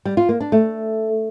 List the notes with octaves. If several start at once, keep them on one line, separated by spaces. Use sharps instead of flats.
G3
F4
A#3
D4
A3